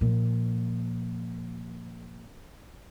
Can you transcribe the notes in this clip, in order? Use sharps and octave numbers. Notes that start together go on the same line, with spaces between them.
A#2 F3